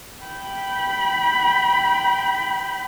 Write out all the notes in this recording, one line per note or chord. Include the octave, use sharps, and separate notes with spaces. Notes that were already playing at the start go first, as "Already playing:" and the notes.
G5 B5